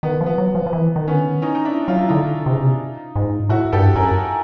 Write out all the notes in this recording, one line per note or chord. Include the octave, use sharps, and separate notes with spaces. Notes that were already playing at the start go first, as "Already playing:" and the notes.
D#3 B3
F3
B3
F#3
F3
F3
E3
D#3
D3 B3 C#4
D#3
C#4 D#4
D#4
D4 E4
F#3 F4
E4
D3 D#4 F4
C3
C#3
C3
G#2
A2 E4 F#4
G2 G4 A4
F#2 G#4 A#4